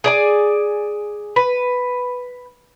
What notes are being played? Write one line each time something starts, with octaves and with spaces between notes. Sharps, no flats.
G#4 D5 G#5
B4